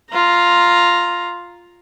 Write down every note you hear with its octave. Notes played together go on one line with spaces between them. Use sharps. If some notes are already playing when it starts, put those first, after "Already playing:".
F4 A#5